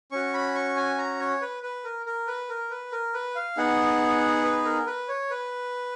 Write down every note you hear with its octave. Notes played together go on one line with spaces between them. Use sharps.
C#4 F#4 C#6
B5
C#6
G#5
A#5
C#5
B4
B4
A#4
A#4
B4
A#4
B4
A#4
B4
F5
B3 D#4 G#4 F#5
B4
A#4
B4
C#5
B4